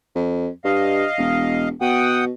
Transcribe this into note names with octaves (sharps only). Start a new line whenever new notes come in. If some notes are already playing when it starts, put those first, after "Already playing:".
F2
G2 D#5 F5
E1
B2 F#5 G5 D#6